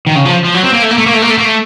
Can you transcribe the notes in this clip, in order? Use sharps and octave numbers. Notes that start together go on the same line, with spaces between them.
D#3
C#3
F3
F3
F#3
C4
A#3
A3
A#3
A3
A#3
A3
A#3
A3
A#3
A3